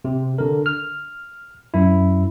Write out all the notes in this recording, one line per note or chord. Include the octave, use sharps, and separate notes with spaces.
C3
D3 A#4
F6
F#2 E4